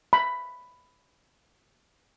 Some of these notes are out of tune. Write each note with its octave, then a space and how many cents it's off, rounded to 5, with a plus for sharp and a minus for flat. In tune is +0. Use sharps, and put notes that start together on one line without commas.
B5 +10